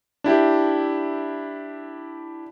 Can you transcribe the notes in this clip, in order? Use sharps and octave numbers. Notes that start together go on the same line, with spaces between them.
D4 E4 G4